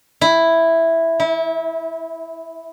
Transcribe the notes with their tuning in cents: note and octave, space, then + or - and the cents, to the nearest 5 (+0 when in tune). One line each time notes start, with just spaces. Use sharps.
E4 +0
E4 -30